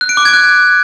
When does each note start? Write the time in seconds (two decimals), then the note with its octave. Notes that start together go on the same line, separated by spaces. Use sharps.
0.01 F#6
0.09 D7
0.17 D6
0.25 G#6
0.33 F#6